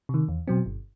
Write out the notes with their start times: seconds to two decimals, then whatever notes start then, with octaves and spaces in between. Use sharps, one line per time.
0.09 C3 D#3
0.28 E2
0.48 B2 F#3 C4
0.66 G1